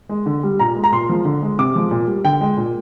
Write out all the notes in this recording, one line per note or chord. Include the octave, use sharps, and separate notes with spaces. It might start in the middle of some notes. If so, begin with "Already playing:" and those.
G#3
D3
G3
A#2 A#5
G#3
A#5
A#2 C6
F3 G#3
D3
G#3
C3 D6
F3 G#3
A#2
G3
D3 G5
G#3
A#2